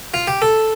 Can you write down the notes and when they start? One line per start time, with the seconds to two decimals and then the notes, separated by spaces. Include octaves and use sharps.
0.14 F4
0.27 G4
0.42 A4